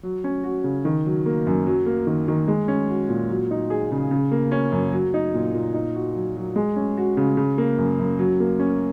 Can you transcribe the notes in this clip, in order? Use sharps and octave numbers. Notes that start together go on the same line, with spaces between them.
F#3
C#4
F#4
C#3
D#3
F#3
A#3
F#2
F#3
A#3
D#3
D#3
G#3
C#4
F#4
A#2
F#3
D#4
G#4
C#3
C#3
A#3
C#4
F#2
F#3
D#4
A#2
A#2
D#4
F#4
F#3
F#3
G#3
C#4
F#4
C#3
C#3
A#3
F#2
F#2
F#3
A#3
C#4